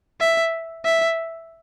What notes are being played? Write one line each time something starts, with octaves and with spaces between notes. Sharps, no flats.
E5
E5